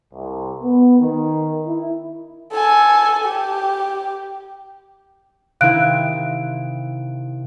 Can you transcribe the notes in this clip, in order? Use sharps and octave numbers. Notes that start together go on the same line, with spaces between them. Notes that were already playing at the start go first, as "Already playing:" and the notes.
C2
B3
D#3
E4
A4 G#5
G4
C3 D#3 E4 F5 F#6 D7